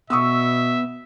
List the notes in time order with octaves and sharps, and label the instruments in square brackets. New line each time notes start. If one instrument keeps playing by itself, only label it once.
[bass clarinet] B2 [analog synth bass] B3 [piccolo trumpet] E5 [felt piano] C#6 D#6 E6